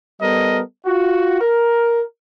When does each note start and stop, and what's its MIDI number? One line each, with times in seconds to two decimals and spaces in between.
0.21 0.60 55
0.21 0.60 59
0.21 0.60 69
0.21 0.60 70
0.21 0.60 75
0.86 1.38 65
0.86 1.38 66
1.41 2.01 70